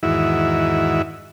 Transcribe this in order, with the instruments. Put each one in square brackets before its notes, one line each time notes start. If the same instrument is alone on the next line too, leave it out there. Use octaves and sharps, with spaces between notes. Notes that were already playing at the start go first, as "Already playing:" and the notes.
[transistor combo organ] E2 G#2 D#3 E4 F#4 E5